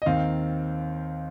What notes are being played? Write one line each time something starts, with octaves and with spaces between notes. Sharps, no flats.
D#5
D#2 D#3 C4 F5